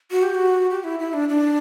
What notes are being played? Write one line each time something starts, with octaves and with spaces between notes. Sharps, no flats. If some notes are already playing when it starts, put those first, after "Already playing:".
F#4
G4
F#4
G4
E4
E4
D4
D4